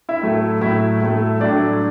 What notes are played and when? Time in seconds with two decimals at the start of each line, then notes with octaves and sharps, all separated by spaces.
0.09 E4 E5
0.21 A2 F#3 A3
0.61 A2 F#3 A3 E4 E5
1.02 A2 F#3 A3
1.40 A2 F#3 A3 D4 D5